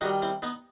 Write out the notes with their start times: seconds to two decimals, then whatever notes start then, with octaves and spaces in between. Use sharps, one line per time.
0.01 D#3 D#4 F#4
0.04 G3
0.22 C4 E4
0.42 B3 D#4